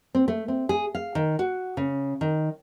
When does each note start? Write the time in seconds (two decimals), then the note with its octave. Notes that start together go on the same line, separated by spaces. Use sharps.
0.15 C4
0.28 A3
0.48 C4
0.69 G#4
0.95 F5
1.15 D#3
1.39 F#4
1.77 C#3
2.21 D#3